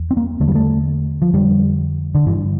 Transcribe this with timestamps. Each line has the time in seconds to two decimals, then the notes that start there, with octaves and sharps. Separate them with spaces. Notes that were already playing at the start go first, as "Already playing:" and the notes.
Already playing: E2
0.11 C4
0.17 A#3
0.40 E2 D3 A3
0.48 G3
0.55 A3
1.22 F3
1.33 F2 D3 G3
2.15 D3
2.26 G2 D3 E3